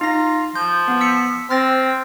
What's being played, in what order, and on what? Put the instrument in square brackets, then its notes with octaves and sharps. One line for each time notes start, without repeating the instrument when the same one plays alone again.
[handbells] D#4 A#6 [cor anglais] F4
[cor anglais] F3 [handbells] G6
[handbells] B3
E6 B6 C#7
[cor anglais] C4 [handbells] F6 A6 A#6